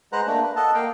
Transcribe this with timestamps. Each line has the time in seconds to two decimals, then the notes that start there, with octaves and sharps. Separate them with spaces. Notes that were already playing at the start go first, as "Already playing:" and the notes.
0.12 G#3 B4 C5 F#5 A#5 F#6
0.27 A3 A#3 D4
0.43 B4
0.56 A4 D#5 F#5 A5
0.74 A#3 F5 G5